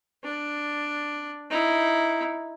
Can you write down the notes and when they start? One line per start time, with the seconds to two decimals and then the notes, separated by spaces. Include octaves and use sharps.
0.24 D4
1.51 D#4 E4